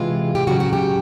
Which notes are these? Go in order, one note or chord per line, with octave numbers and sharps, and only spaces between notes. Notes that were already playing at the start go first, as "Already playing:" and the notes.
Already playing: C3 E3 G#3 F4
G4
C#3 F#3 F#4
F#4
G4